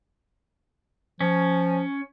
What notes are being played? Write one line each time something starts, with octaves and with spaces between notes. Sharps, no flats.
F3 C#4